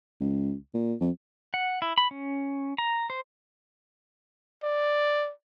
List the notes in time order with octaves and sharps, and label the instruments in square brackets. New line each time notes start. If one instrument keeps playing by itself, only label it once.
[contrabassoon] C#2
A#2
F2
[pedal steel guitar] F#5
E4
B5
C#4
A#5
C5
[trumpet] D5